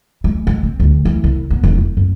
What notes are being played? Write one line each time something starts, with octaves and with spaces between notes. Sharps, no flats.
G#3
G#3
C4
D2
E3
C2
B3
E1
C4
F#2